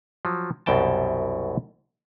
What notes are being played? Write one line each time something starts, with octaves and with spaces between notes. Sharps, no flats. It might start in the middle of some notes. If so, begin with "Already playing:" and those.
F3 F#3
C2 F#2 B2 G5 A5